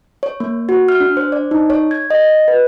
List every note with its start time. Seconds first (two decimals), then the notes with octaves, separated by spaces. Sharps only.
0.23 C#5
0.40 A#3
0.69 F#4
0.89 F6
1.00 D4
1.17 C5
1.32 D5
1.51 D#4
1.70 C#5
1.91 G#6
2.10 D#5
2.48 B4